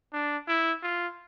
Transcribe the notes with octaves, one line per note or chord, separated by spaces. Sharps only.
D4
E4
F4